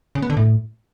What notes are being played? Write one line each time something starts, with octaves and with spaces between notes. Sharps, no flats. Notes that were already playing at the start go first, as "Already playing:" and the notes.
C#3
B3
D3
A2